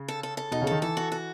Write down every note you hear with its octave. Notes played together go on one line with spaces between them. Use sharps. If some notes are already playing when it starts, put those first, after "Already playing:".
Already playing: C#3
A4
A4
A4
B2 D#4
C#3
D#3 A4
E3 A4
F#4
F#4